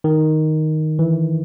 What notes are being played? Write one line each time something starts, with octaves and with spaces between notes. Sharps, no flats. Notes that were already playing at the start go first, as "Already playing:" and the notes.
D#3
E3